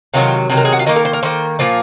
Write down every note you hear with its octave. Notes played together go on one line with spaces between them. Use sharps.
C3 D#3 F#3 F4
C3 D#3 F#3
A#4
G#4
F#4
F4
D#3 A#3 D#4
A#4
C5
A#4
D#3 A#3 C5
A#2 F3 A#3